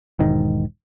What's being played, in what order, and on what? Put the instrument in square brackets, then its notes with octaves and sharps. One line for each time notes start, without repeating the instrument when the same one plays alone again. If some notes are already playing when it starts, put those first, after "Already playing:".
[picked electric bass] E1 G#2 D#3